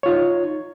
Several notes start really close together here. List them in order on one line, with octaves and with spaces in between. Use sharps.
C#5 F4 D#4